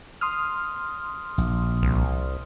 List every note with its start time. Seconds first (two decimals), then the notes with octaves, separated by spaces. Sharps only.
0.21 C6 D#6 F6
1.38 A#1
1.83 C2